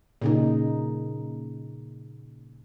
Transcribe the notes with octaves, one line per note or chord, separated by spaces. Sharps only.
A#2 C#3 D#4